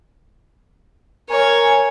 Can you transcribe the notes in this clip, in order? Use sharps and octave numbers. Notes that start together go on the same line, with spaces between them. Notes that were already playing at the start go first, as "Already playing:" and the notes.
A#4 C#5 G#5